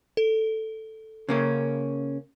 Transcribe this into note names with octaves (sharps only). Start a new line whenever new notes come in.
A4
C#3 A#3 C#4